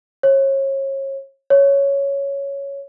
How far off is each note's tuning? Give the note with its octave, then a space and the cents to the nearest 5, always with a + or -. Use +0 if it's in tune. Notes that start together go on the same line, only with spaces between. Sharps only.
C#5 -35
C#5 +5